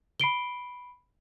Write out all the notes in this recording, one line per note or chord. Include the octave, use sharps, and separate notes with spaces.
B5 C7 D7 G7